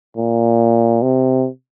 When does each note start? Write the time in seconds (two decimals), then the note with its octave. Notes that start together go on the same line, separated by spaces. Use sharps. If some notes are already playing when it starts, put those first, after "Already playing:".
0.17 A#2
1.02 C3